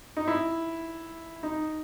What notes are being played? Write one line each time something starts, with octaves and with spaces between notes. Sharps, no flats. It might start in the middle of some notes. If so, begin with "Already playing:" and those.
D#4
E4
D#4